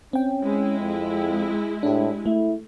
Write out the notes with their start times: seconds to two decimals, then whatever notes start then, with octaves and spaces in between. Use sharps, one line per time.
0.13 C4 C#4 G5
0.42 G#3 E4
0.80 F2
1.83 A2 D4 G4
2.26 A3 E4